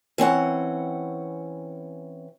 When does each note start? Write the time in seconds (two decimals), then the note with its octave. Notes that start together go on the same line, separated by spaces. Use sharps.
0.18 E3 C4 C#4 F#5